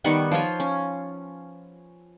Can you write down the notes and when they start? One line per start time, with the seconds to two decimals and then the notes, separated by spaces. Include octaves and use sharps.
0.04 D#3 G3 B3 C#6
0.31 F3 F4 C5 C#5
0.60 C#4